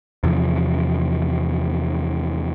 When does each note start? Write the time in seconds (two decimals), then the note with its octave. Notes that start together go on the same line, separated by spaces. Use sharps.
0.24 E2 C3 F3